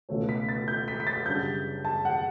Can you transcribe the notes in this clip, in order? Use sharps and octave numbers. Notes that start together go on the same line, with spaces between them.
C#2 B2 A3 C#4
B6
A6
G6
B6
B6
A6
F#2 C#3 G3 D4 G6
A5
F#5